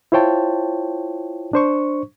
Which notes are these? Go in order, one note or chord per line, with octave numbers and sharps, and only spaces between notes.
E4 F4 C5 C#5 G5 A5
D4 C5 C#6